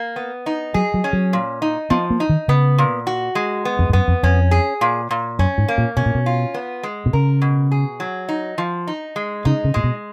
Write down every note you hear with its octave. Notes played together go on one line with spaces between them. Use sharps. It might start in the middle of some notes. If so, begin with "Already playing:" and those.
Already playing: A#3
B3
D#4
F#3 G#4
F#3
C#4
F#3
A#2
D#4
F3 B3
A#3
D#4
D#3
C#3 B3
A#2
F#4
G#3
B3
F2
G#2
F#2 B3
F2
F2 C#4
G#4
A#2
A#2
F#2 C#4
G#2
A#3
A#2
B2 C#4
A#2
B2
F4
B3
G#3
B2
C#3 A#4
B2
G#4
F#3
D#4
F3
D#4
G#3
C#3 D#4
C#3
A#2 G#3
B2